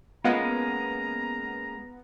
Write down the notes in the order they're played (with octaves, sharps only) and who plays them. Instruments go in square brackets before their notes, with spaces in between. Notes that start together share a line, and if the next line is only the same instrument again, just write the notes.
[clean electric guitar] G#3 A#3 C#4 [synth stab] B3 [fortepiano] F4 D#5 F5 [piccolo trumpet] A#5